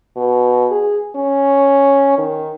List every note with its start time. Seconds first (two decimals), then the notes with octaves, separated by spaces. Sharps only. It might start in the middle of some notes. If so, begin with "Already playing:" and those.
0.16 B2
0.71 G#4
1.16 C#4
2.18 D#3